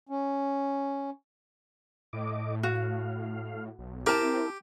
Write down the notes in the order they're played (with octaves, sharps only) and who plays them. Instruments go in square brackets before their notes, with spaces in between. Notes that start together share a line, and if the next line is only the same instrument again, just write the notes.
[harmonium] C#4
[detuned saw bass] A2 [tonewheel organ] D#5 D6
[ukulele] F#4 [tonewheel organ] F5
[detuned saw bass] B1
[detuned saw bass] C4 [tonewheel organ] E4 [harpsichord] G4 [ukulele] A#4 A5